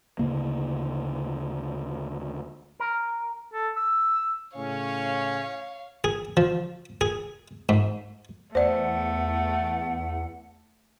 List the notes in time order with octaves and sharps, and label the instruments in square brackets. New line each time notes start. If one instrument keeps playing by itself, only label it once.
[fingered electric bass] D2 C#3 A#3
[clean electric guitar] A#4
[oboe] A4
E6
[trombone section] A2 C#3 [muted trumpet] C#4 [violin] C#5 [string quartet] F5
[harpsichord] G#4
F3
G#4
G#2
[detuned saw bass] E2 [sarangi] A3 [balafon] C5 D5 [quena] F#5